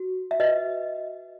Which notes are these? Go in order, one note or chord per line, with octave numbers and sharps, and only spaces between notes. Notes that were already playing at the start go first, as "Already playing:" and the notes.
Already playing: F#4
E5
F#4 B4 D#5